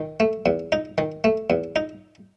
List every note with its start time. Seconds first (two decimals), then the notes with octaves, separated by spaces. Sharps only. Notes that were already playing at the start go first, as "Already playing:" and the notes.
Already playing: D#3
0.20 A3
0.46 E2
0.72 D#4
0.98 D#3
1.24 A3
1.50 E2
1.76 D#4